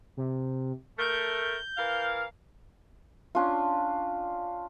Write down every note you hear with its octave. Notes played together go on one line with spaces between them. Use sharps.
C3
A3 A#4 G6
E3 A#4 F5
C#4 D4 F4